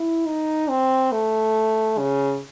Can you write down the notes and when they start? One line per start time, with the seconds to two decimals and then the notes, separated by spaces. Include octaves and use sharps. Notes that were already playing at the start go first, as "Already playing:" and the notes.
Already playing: E4
0.26 D#4
0.69 C4
1.12 A3
1.98 C#3